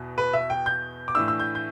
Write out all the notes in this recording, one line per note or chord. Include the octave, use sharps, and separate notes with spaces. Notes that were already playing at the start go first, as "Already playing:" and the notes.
Already playing: E2 B2 B3
B4
E5
G5
G6
D6
A2 E3 A3 D4 E6
E6
G6
G6